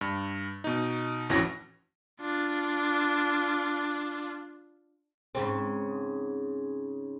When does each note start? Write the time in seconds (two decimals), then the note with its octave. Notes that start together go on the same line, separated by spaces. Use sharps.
0.01 G2
0.64 B2 D#4
1.29 A1 F2 E3 C#4 F#4 A#6
2.21 D4 F4
5.35 G#2 C#3 C4